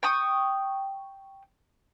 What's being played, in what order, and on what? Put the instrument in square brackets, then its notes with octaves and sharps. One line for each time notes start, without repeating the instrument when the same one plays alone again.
[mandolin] G5 C#6 D#6